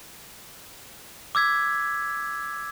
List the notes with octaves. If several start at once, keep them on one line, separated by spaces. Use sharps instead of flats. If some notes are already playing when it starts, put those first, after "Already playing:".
D6 E6 G#6 B6